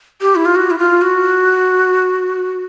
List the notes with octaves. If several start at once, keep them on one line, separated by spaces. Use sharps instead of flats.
G4
E4
F4
F#4
E4
F4
F#4